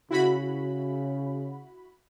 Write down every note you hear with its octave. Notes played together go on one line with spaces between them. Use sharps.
C#3 E4 F#4 B5